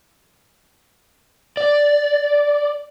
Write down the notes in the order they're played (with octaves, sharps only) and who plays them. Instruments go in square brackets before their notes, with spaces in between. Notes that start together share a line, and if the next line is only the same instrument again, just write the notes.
[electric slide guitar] D5